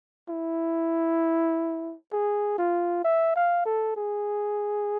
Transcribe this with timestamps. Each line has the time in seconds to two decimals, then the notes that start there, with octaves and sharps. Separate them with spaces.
0.29 E4
2.13 G#4
2.58 F4
3.04 E5
3.36 F5
3.66 A4
3.97 G#4